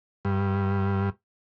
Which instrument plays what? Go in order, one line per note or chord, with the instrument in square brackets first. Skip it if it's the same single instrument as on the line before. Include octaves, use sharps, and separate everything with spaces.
[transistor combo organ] G2